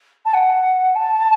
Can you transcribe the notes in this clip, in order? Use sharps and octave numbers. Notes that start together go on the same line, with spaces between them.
A5
F#5
A5